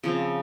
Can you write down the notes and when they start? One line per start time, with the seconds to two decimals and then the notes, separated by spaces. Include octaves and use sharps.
0.04 C#3 F3 C4